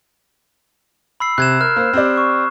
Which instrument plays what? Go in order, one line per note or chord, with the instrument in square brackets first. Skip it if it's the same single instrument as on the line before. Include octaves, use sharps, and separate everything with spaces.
[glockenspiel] B5 E6 C7
[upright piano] C3 [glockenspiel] F#6 G#6 E7
[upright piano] A#4 [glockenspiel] F6
[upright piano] A#3 C5
C4 G4 D5
[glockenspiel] C#6